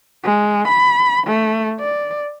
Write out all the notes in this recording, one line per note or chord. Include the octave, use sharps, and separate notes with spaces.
G#3
B5
A3
D5